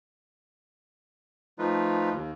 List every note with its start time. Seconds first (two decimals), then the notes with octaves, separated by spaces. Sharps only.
1.59 F3 A3 D#4 F4 B4
2.12 D#2